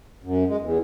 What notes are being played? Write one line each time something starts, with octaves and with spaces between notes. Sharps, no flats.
F#2
G#3
E2